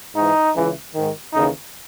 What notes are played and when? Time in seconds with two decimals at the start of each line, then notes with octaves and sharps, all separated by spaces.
0.16 G#2 E3 D#4
0.55 C#2 C#3 E3
0.95 G#2 D#3
1.34 D#2 C#3 E3 D#4